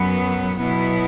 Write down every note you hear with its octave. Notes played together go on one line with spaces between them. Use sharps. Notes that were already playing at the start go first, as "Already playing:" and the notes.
Already playing: F#2 F#3 B3
B2 F#3 B3 E4